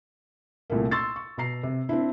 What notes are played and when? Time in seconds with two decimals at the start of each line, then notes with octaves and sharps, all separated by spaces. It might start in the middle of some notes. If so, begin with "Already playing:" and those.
0.70 C2 A#2 A3 A#3
0.91 C6 C#6 E6 A6
1.16 C#6
1.38 B2 A#5 C7
1.63 C3
1.89 C4 D4 E4